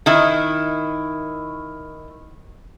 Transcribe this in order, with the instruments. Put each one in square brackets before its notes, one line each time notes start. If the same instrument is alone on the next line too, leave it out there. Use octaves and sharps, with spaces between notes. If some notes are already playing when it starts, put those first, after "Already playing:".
[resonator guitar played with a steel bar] D#3 E4